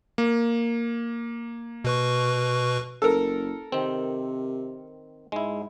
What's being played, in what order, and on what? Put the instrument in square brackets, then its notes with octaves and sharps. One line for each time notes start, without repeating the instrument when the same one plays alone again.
[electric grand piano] A#3
[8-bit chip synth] B2 B4 C#6
[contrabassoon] F#1 [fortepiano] A4 A#4
[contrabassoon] C3 [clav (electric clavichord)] D#3 C4
[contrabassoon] G#2 [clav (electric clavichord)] G#3 E4